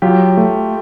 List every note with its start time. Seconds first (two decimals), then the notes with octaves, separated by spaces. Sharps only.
0.02 F#3 F4 G4
0.37 A3